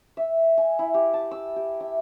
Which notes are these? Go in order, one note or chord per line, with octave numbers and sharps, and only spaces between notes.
E5
G#5
E4
G4
A5
E6
G4
E5